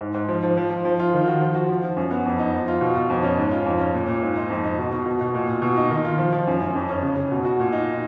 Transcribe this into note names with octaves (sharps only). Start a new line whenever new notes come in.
G#2
G#2
F3
F3
F3
F3
F3
F4
D#3
F#4
F3
F#4
F3
F3
F#2
B3
F2
D#4
F3
F4
B2
B2
F2
C#4
G#2
F4
F2
C#4
A#2
A#2
G#2
D#4
F2
D#4
B2
B2
B2
B2
A#2
A#2
B2
D#4
D#3
F4
F3
F3
F#2
F#2
F2
C#4
C#3
C#3
B2
F#4
A#2
D#4